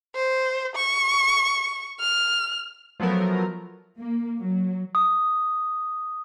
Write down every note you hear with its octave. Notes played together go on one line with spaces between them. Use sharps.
C5
C#6
F6
F3 F#3 A3 B3 A#4
A#3
F#3
D#6